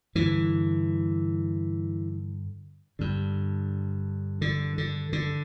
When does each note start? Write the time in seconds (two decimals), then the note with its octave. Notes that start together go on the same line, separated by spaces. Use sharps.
0.15 G2 D3 E3
2.99 G2 D3
4.41 D3
4.78 D3
5.13 D3